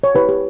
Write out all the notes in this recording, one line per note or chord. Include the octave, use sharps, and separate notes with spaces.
C#5
E4 G4 B4
G4